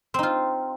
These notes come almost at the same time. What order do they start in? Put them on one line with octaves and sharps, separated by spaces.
C4 D#4 F4